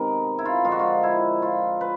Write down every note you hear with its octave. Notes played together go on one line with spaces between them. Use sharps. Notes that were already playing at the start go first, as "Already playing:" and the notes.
Already playing: C3 D#3 G#3 B3 A#4
E4
F4
D3 F3 G#3 F4
F#4
F4
E4
F4
B4